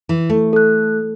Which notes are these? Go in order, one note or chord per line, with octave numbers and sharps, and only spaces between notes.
E3
A3
A4 F#6